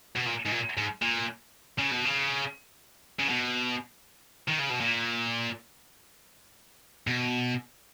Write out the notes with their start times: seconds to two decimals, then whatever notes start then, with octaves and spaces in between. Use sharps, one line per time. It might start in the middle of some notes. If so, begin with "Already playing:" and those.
0.16 B2
0.27 A#2
0.46 G#2
0.52 A#2
0.78 G#2
1.02 A#2
1.78 C#3
1.91 B2
2.05 C#3
3.20 C#3
3.29 B2
4.48 D#3
4.59 C#3
4.69 B2
4.80 A#2
7.07 B2